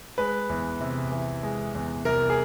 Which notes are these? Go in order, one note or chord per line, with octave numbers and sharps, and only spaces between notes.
G#3 B4
E2
C3
E3
G#3
E2
C2 A#4
G#4